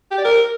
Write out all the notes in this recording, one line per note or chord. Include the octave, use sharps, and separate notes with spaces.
G4
D5
A#4